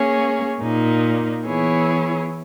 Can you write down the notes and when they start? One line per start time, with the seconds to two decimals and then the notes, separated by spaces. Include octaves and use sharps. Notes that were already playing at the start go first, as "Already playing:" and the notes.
Already playing: A#3 C#4 G#4 C#5
0.60 A#2 A#3 D#4
1.45 E3 B3 E4 G#4 C#5